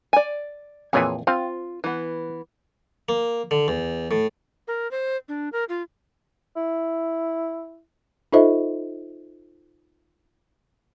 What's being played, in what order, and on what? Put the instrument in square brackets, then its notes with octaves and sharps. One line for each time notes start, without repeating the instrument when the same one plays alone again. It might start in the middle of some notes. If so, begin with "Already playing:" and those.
[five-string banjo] D5 G#5
[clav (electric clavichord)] F2 A#2 E3 [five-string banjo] G#4 C#5 G#5
[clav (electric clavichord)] C4 F5 [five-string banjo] F4
[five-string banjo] E3 B3
[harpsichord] A#3
D3
E2
A2
[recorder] A#4
C5
D4
A#4
F4
[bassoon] E4
[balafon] D#4 F4 A4 C5 D#5 E5